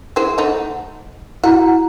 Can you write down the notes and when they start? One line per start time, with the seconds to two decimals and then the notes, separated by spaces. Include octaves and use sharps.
0.16 G#3 E4 C5
0.38 A3 D#4 F#5
1.44 E4 F#4 F#5 A#5